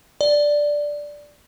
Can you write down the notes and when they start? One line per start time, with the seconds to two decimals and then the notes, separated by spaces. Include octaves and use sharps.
0.21 D5